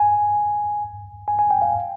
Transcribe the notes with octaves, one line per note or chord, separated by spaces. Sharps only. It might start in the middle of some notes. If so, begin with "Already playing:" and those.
Already playing: G#5
G#5
G#5
G5
F5